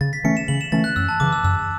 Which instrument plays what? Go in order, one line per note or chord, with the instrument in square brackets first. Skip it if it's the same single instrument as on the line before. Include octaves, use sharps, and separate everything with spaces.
[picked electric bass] C#3 [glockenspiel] A6
[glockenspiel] B6
[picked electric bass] E3 A3 C#4 [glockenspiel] C#7
[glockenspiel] E7
[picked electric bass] C#3 [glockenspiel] F#7
[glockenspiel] E7
[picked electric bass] E3 A3 C#4 [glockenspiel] A6
[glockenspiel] F#6
[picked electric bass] F#2 [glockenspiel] E6
[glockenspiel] A5
[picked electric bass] C#3 E3 [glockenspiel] D6
[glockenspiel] E6
[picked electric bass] F#2 [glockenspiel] E6